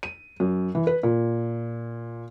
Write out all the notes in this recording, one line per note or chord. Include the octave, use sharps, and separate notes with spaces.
D#7
F#2
E3
B4
A#2